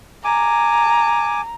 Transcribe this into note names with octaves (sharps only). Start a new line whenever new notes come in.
G#5 A#5 D6